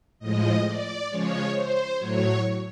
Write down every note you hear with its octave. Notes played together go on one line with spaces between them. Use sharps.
A2 F3 G#3 D#5
D5
C#3 F3 G#3 C#5
C5
A2 F#3 C#5